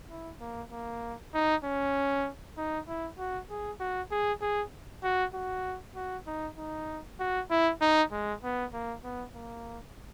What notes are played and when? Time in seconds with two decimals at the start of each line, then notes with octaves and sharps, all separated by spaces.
0.10 E4
0.41 A#3
0.72 A#3
1.34 D#4
1.64 C#4
2.58 D#4
2.88 E4
3.18 F#4
3.50 G#4
3.80 F#4
4.11 G#4
4.42 G#4
5.03 F#4
5.34 F#4
5.96 F#4
6.27 D#4
6.57 D#4
7.20 F#4
7.50 E4
7.81 D#4
8.12 G#3
8.44 B3
8.73 A#3
9.04 B3
9.35 A#3